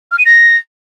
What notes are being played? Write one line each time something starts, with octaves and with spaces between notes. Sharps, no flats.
F6
D#7
A#6